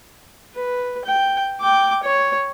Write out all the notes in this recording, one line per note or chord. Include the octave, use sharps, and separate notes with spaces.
B4
G5
G5 D6
C#5